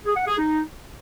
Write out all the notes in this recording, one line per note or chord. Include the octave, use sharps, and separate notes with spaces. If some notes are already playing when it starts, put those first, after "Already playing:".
G#4
F#5
G#4
D#4